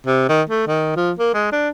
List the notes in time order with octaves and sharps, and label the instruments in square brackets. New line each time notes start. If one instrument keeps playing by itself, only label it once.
[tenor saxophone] C3
D#3
A3
D#3
F3
A#3
G#3
D4